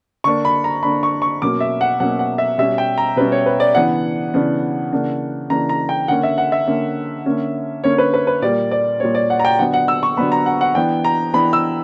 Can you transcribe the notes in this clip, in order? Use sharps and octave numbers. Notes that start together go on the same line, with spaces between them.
D3 A#3 D4 C#6
B5
A#5
D3 A#3 D4 B5
C#6
C#6
B2 F#3 A#3 C#4 D6
E5
F#5
B2 F#3 A#3 C#4 F#5
F#5
E5
B2 G3 C#4 E5
G5
A#5
B2 G3 C#4 B4
C#5
B4
D5
C#3 E3 B3 D4 F#5
C#3 E3 B3 D4
C#3 E3 A#3 D4
C#3 E3 A#3 D4 A#5
A#5
G5
D3 A#3 C#4 F#5
E5
F#5
E5
D3 A#3 C#4
D3 A#3 C#4
D3 A#3 C#4 C#5
B4
B4
B4
A#2 G3 A#3 D5
D5
A#2 G3 A#3 C#5
D5
F#5
A#5
G5
D3 F#3 B3 D4 F#5
F#5
E6
C#6
D3 F#3 B3 D4 B5
A#5
F#5
F#5
E3 B3 D4 G5
A#5
E3 B3 D4 B5
E6